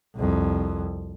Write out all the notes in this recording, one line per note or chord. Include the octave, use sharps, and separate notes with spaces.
C2 F2